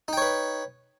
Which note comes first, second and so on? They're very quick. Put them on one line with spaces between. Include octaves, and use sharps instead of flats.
D#4 G5 C#5 B4